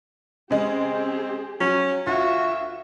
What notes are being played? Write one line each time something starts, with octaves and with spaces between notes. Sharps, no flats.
C#3 G#3 C4 G4 G#4
F#3 C#4
D2 F4 F#4 E5